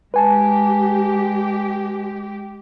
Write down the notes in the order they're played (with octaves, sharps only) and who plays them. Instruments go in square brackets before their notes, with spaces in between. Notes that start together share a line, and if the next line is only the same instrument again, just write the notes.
[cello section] G#3 G4 [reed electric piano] B4 G#5 A5